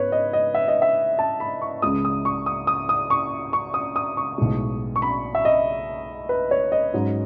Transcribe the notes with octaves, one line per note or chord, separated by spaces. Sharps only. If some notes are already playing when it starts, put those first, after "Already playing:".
Already playing: G#2 B3 B4 C#5
D#5
D#5
E5
D#5
E5
A5
B5
C#6
C#2 C#3 G#3 D#6
D#6
C#6
D#6
D#6
D#6
C#6
C#6
D#6
D#6
C#6
B1 A2 G#3
C#6
B5
E5
D#5
B4
C#5
D#5
G#2 F#3 C#4